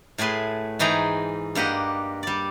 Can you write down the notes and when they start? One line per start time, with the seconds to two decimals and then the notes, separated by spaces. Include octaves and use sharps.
0.18 A2 A3 G#4 B4 C6
0.79 G#2 E3 D#4 G#4 G5 A#5
1.55 G2 A#3 G4 D#5 F#5
2.23 G3 D5